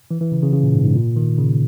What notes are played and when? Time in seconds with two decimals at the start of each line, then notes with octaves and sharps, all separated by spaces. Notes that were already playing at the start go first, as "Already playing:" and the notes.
0.11 E3
0.21 E3
0.32 C#3
0.42 C#3
0.53 C#3
0.63 A#2
0.74 G#2
0.84 G#2
0.95 A#2
1.16 D#3
1.38 C#3